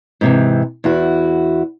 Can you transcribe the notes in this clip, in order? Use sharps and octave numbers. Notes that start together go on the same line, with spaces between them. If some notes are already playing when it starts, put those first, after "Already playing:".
G#2 C3 E3
E2 E4 F#4